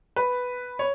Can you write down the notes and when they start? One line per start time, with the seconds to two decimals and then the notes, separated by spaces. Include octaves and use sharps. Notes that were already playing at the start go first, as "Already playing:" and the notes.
0.16 B4
0.79 C#5